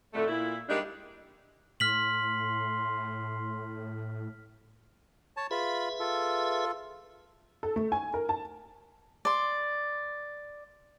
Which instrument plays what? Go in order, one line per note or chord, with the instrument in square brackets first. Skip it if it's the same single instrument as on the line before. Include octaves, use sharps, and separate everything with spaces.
[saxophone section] F2 A2 D3 A3
A#2 E4
G2 G3 G#3 A#3 D4 D#4
[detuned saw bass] A2 [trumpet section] C6 [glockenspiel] F6 B6 F#7
[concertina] C#5 A5
[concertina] F4 B5 [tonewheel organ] G#4 B4 E5
[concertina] F4 A4
[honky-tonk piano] A4
A3
G#5
A#4
A5
[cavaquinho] D5 C6